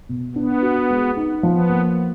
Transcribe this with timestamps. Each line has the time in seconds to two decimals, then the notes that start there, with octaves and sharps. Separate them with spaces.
0.09 B2
0.36 B3 D4
0.62 F#4
0.90 G#3
1.17 D#4
1.43 F3 B3
1.69 A#3